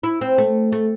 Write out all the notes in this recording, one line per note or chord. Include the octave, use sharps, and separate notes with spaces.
E4
C4
A3
A3